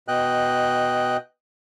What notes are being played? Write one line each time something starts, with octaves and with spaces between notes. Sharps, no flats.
B2 D#5 G5 F#6